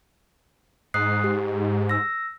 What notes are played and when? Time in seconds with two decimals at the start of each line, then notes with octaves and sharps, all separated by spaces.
0.94 G#2 D#6 F#6 C7
1.24 G4
1.89 E6 A#6